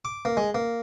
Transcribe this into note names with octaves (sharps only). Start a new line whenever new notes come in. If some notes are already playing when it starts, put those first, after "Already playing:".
D6
A#3
G#3
A#3